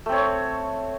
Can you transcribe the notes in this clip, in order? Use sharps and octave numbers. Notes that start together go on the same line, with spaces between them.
A3 C4 C#5